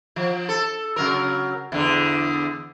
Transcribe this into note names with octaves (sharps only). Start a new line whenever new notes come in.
F3
A4
C#3 F#3 A#4
E2 D3